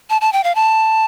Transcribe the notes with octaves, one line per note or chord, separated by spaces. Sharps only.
A5
A5
G5
F5
A5